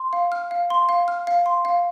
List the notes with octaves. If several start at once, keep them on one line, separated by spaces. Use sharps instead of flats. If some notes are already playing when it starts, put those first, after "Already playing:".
Already playing: C6
F5
F6
F5
C6
F5
F6
F5
C6
F5